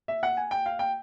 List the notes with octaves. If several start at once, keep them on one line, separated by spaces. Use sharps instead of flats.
E5
F#5
G#5
G5
F5
G5